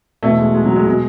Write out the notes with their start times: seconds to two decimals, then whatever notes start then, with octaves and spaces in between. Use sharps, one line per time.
0.23 E2 B2 A3
0.39 G#3
0.54 G#3
0.65 F#3
0.76 G#3
0.86 B2 G#3